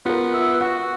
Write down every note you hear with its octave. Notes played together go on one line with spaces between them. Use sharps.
B3 F4 A#4
E5
F#4 F#5